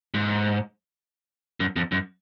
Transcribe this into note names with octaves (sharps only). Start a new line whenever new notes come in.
G#2
F#2
F2
F#2